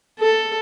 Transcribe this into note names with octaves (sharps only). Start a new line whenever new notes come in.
A4